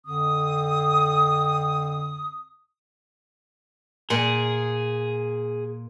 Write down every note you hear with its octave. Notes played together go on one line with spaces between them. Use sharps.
F2 D3 C4 D#6
A#2 G#4